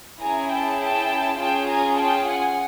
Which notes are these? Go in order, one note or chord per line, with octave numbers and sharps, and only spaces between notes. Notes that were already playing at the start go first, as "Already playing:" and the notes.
C#4 E4 G#4 G#5 A#5
G5 A5
G5 A5
C#4 F4 G#4 G5 A5
G#5 A#5
G5 A5
F#5 G#5